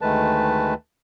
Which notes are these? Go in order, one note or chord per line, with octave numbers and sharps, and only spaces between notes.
D2 D#3 G#3 A3 B4 A5